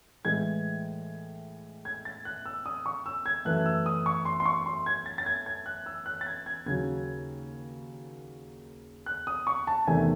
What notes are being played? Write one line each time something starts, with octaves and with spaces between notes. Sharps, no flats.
A2 E3 G#3 G#6
G#6
A6
F#6
E6
D#6
C#6
E6
G#6
F#2 E3 A3 F#6
E6
D#6
C#6
C6
C6
C#6
C6
G#6
A6
A6
G#6
G#6
F#6
E6
F#6
A6
G#6
G#6
D#2 C#3 F#3 G#6
F#6
D#6
C#6
A5
E2 C3 D#3 A3 G#5